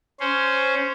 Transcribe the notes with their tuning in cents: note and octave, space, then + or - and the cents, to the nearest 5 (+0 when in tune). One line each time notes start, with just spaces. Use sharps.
C#4 +0 C5 -5